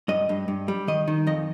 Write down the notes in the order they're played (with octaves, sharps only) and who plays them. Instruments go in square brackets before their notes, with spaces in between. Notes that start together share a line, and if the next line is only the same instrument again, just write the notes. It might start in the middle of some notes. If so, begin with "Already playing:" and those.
[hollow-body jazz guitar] G2 D#5
G2
G2
G3
D#3 D#5
D#3
F2 D#5